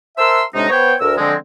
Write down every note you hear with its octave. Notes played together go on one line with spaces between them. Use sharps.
A#4 C5 E5 A5 C6 E6
A2 C3 G#3 D4 D#4
B3 C5 C#5 G5
D2 A#4 E6
D3 F3 G#3 C4